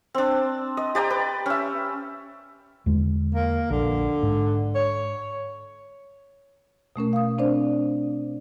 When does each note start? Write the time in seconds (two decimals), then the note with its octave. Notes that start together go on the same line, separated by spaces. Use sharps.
0.14 C4 D4
0.77 D#5
0.95 G4 D5 G5 A#5
1.10 B4
1.46 C#4 E5
2.86 E2 D3 G#3
3.35 A#3
3.71 A#1 D3
4.22 G#2
4.75 C#5
6.96 B2 A3 C#4 A#4
7.13 F5 D#6
7.38 C4 D4 C5 D5